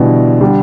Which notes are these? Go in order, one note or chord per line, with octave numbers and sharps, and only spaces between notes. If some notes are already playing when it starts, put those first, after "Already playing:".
Already playing: B2 D3 E3 G3
D3 G3